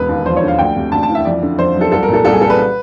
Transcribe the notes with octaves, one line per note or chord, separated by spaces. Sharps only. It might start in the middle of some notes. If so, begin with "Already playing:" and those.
Already playing: E1 B4
D#2
F3 C5
C#5
D3
F5
D2 G5
C3
D2 A5
A5
E3
E5
F2 D5
D3
F2 C5
F#3
A4
C2 A4
A#4
A#2 A4
C2 A4
G#4
G3 A4
B4